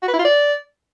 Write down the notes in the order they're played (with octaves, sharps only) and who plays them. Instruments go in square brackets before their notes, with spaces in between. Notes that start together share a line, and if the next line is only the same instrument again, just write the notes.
[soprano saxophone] F#4
B4
E4
F4
D5